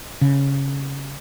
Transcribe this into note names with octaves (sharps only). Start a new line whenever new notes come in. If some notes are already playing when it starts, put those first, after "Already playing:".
C#3